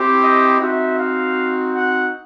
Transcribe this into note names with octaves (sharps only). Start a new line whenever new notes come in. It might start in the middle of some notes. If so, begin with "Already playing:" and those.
Already playing: C4 E4 G4
D#5
C4 D#4 F#4 E5
F5
F#5